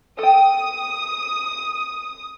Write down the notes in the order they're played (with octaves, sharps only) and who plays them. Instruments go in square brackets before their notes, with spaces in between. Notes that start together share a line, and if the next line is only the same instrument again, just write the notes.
[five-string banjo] A4 G5 [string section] D#6